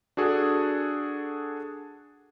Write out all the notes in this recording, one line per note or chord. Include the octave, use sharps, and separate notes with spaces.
D4 F#4 G#4 A4